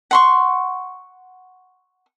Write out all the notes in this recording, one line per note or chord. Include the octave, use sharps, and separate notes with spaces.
F#5 C6 C#6